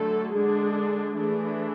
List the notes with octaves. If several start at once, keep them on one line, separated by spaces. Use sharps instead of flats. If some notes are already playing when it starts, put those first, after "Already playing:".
Already playing: D3 F#3 A3 A4
D3 G#3 D4 G#4
E3 A3 D4 G#4